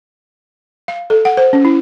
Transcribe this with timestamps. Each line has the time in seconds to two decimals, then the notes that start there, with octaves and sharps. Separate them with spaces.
0.88 F5
1.10 A4
1.25 F#5
1.37 C5
1.53 C#4
1.65 E4